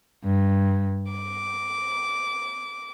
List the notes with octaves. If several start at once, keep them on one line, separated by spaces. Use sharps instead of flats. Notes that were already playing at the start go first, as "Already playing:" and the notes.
G2
D6